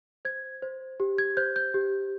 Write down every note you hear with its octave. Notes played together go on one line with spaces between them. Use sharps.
C5 G#6
C5
G4
G#6
C5 G6
G6
G4